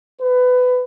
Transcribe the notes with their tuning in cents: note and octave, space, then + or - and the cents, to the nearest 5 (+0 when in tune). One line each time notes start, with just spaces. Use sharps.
B4 +20